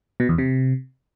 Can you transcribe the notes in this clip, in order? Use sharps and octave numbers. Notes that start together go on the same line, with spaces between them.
B2
E2
C3